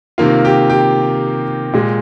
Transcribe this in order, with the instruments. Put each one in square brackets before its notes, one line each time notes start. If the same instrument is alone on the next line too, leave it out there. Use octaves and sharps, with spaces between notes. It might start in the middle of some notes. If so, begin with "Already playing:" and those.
[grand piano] C3 D#3 A#3 F4
G4
G4
A#2 G#3